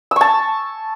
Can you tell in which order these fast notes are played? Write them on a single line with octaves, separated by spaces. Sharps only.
E6 C#6 A5